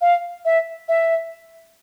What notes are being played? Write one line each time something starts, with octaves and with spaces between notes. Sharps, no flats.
F5
E5
E5